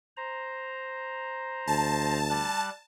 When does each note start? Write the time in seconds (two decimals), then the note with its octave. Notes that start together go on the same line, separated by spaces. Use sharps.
0.17 C5 A#5
1.67 D2 A5
2.30 G3 F#6